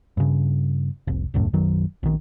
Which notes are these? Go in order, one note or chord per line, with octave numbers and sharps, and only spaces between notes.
G2 C#3
F1 C2
D#1 C#2 F#2 A2
B1 F#2 D#3 F#3
A#1 D#3